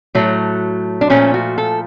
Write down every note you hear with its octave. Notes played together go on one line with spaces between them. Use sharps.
A2 F#3 A3
D4
A#2 F3 A3 C#4
F#4
A4